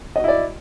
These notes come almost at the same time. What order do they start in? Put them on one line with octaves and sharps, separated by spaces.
D#5 F#4 E4 D5